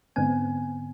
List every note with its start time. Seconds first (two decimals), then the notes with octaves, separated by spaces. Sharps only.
0.16 G#2 D3 B3 C4 G#5